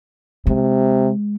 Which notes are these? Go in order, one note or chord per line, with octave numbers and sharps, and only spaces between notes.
C3 G#3